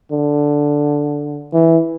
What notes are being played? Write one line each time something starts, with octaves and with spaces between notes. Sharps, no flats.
D3
E3